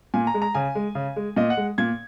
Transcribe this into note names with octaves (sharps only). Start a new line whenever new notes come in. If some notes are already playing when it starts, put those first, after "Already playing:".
A#2 G#5
A#5
G#3
A#5
C#3 G#5
G#3
C#3
G#3
A#2 D#5
F#5
G#3
A#2 G#6